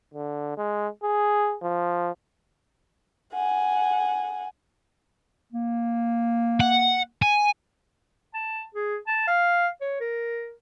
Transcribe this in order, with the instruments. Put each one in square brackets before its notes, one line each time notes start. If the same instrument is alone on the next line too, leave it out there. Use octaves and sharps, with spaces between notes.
[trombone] D3
G#3
G#4
F3
[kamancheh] F#5 G#5
[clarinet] A#3
[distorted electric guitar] F#5
G#5
[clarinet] A5
G#4
A5
F5
C#5
A#4